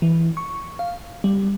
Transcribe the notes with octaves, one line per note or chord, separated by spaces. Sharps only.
E3
C#6
F5
G3